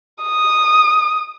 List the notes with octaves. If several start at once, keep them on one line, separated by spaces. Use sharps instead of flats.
D#6